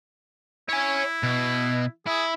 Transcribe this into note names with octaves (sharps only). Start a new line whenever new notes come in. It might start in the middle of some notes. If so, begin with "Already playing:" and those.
E4 C#5 G#5
B2
E4 G#4